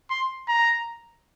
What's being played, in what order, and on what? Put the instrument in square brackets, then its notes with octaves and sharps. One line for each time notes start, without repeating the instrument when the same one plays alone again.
[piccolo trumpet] C6
A#5